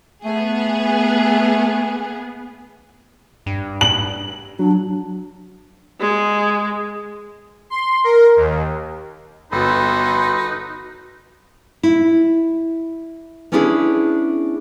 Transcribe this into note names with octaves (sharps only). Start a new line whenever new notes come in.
A3 B3 G#4
G2
F#7
F#3 D4
G#3
C6
A#4
D#2
G1 B3 D#4 F#4 A4 B4 B5 C6
E4
B3 C#4 D4 E4 F#4 G#4